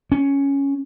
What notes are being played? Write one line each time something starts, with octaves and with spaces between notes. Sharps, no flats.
C#4